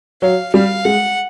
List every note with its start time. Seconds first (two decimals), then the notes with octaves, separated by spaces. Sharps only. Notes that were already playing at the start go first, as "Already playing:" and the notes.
0.22 F#3 F5
0.54 G3 F5
0.85 G#3 F#5